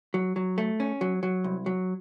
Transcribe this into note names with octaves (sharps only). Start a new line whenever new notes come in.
F#3
F#3
A3
C#4
F#3
F#3
C2
F#3